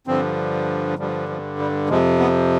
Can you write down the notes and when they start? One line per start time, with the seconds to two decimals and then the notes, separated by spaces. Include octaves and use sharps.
0.07 G2 D3 F3 C4
0.98 G2 D3 F3 G3
1.29 F3
1.59 G3
1.89 F2 C3 F3 G#3
2.19 B3